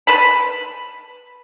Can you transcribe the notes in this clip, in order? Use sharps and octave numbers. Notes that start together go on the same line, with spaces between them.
B4 A5 B5